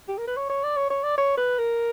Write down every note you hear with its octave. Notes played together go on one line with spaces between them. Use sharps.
G4
A#4
B4
C#5
C#5
D5
C#5
C#5
D5
C#5
B4
A#4